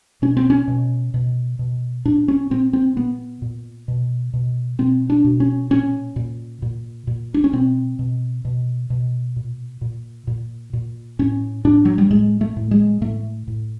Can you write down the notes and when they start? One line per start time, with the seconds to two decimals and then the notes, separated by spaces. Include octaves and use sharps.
0.22 B2 C#4
0.37 C4
0.50 C#4
0.68 B2
1.14 B2
1.59 B2
2.05 A#2 D4
2.28 C#4
2.51 A#2 C4
2.73 C4
2.96 A#2 B3
3.42 A#2
3.88 B2
4.34 B2
4.79 B2 C4
5.10 D4
5.25 B2
5.40 C#4
5.70 A#2 C#4
6.16 A#2
6.62 A#2
7.07 A#2
7.34 D4
7.44 C#4
7.53 B2 C4
7.99 B2
8.45 B2
8.90 B2
9.36 A#2
9.81 A#2
10.27 A#2
10.73 A#2
11.19 A2 C#4
11.65 A2 D4
11.85 F#3
11.98 G3
12.10 A2 G#3
12.41 A3
12.56 A2
12.71 G#3
13.01 A2 A3
13.47 A2